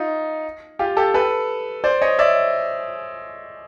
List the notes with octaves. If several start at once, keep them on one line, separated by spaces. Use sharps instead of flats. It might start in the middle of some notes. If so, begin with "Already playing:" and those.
Already playing: D#4 F4
F4 G4
G4 A4
A4 B4
C5 D5
C#5 D#5
D5 E5